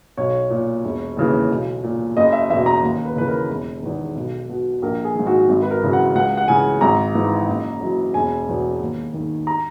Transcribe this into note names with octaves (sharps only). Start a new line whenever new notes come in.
B1 C#5
A#2
E1
D#2 C#3 E3
B1
A#2
F#1 D#5
E5
E2 B2 E5
A#5
D#2
B4
C#3 E3 B4
A#4
E1
E2 D#3
B1
B2
A#1 A#4
G#4
G#2 D#3
F#4
G#1
B4
A#4
F#2 C#3 E3
F#5
C#2 F#5
F#5
C#3 E3 G#5
G#1 A#5
G#2 E3
F#1
F#2 E3
E1 G#5
E2 B2
D#2
D#3
A#5